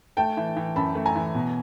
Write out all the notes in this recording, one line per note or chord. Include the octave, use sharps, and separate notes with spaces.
A3 G5 A5
E3
E3
F#2 A5 B5
A3
G#5 A#5
E3
B2